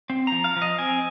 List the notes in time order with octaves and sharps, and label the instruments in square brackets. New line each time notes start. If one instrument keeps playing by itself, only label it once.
[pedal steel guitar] C4
F3 A#5
F5
F3
D#5
C4 G#5